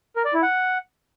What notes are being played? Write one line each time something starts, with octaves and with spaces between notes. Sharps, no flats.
A#4
D5
E4
F#5